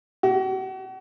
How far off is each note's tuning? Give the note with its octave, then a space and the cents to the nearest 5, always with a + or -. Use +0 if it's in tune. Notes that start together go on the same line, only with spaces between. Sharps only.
F#4 +40